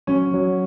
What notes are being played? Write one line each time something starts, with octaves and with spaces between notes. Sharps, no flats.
F#3 C#4
F#3